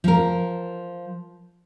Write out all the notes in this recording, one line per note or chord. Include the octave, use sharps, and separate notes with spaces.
F3 A#4